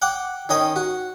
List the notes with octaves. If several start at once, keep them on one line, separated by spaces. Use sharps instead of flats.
F#5 G5 D6
D#3 C#4 D#5 G5
F#4